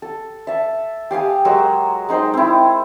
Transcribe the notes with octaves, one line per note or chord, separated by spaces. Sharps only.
A4
E5 A5
G4 F5 G#5 D#6
F#3 G#3 A#4 E6
G#3 D#4 C5 G5
C4 E4